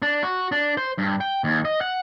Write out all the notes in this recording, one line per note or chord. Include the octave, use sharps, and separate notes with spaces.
D4
F#4
D4
C5
G2
G5
D#2
D#5
F#5